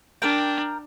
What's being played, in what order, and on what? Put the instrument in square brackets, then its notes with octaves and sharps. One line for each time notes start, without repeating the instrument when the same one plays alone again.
[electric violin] D4 [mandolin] A#4 G5